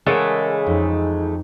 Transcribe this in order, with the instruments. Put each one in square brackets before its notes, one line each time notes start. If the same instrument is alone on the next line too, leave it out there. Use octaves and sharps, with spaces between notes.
[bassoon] C#3 [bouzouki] E3 G#3 A3 [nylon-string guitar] A#4 F#5
[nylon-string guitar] F2 [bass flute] D#4